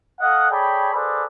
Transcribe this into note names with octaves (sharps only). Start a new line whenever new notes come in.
A4 D#5 F5 F#5
G#4 A4 C#5 D5 G5 B5
F#4 G#4 A4 B4 C5 D5